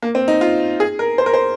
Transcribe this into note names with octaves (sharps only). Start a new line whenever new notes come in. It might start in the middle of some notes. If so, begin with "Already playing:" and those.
A#3
C4
D#4
F4
G#4
A#4
C5
A#4
C5